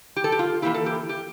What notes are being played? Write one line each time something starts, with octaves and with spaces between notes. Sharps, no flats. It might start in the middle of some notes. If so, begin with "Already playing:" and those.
G4
A4
G4
F4
E3 A#3 E4 G4
A4
G4
G4